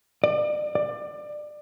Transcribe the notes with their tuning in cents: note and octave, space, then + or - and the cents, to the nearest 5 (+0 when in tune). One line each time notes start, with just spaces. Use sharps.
D5 +35
D5 +25